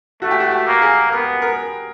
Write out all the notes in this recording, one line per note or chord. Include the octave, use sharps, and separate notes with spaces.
A3 F#4
G4
F#4
G4
A#3
G#4
B3 A#4
A#4